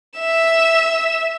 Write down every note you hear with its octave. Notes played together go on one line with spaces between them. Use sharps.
E5 E7